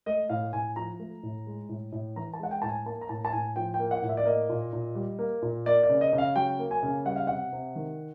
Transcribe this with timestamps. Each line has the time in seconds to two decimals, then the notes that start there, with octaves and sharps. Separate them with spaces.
0.06 A3 D#5
0.29 A2 F5
0.53 A2 G#5
0.76 F3 A#5
0.99 A3
1.23 A2
1.47 G#3
1.69 A2
1.92 A2
2.16 E3 A#5
2.33 A5
2.39 G#3 F#5
2.51 G5
2.62 A2 A5
2.69 G#5
2.86 A#3 A5
3.01 A#5
3.09 A2 A5
3.25 A5
3.32 A2 G#5
3.56 F3 G5
3.74 G5
3.79 A#3
3.91 F#5
4.02 A2
4.09 E5
4.17 D5
4.25 A#3 D#5
4.49 A#2
4.73 A#2
4.95 G3
5.19 A#3
5.42 A#2
5.66 A#3 D5
5.83 D5
5.89 C#3
6.01 D#5
6.13 C#3
6.18 F5
6.36 F#3 G5
6.59 A#3
6.71 G#5
6.83 C#3
7.05 G3 F#5
7.16 F5
7.27 C3 F#5
7.52 C3
7.76 D#3